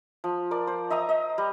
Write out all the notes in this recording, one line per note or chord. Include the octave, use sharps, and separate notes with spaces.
F3
A#4 D5
C5
D#5 E5 A#5 D#6
D#5
G3